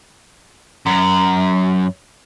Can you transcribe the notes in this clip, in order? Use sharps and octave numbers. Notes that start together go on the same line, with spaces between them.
F#2